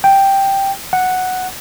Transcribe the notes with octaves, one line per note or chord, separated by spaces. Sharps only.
G5
F#5